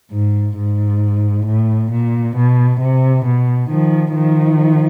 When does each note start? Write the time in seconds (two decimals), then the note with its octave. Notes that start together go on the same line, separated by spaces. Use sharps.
0.12 G#2
0.57 G#2
1.47 A2
1.92 A#2
2.37 B2
2.80 C3
3.25 B2
3.70 D#3 F3
4.14 D#3 F3